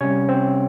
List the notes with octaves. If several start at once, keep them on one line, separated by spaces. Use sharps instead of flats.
C3 G3 C#4 C#5
C4 C5